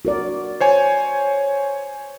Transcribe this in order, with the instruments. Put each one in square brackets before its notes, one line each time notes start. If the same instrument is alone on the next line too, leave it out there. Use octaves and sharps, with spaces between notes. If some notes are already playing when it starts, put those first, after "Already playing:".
[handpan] F#4 A#4 D5
[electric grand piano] C5 C#5 G#5